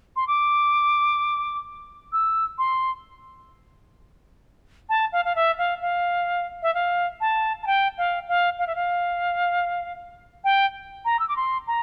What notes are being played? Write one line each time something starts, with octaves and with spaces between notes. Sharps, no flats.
C6
D6
E6
C6
A5
F5
F5
E5
F5
F5
E5
F5
A5
A5
G5
F5
F5
F5
E5
F5
G5
A#5
E6
D6
C6
A#5